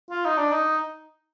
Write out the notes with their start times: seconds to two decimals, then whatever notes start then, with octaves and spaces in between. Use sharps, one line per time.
0.10 F4
0.25 D#4
0.38 D4
0.52 D#4